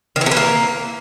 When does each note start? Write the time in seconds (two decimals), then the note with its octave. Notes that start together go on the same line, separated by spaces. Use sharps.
0.16 D#3
0.21 E3
0.26 C3
0.31 E3
0.37 A#3